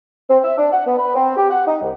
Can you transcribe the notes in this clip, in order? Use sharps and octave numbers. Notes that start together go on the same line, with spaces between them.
C4
E5
D4
F#5
B3
B4
C4
G4
F#5
D#4
C2